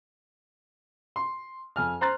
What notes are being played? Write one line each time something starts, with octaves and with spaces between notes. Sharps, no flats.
C6
F2 G#5 F6
C5 A#5 C6 F#6 A6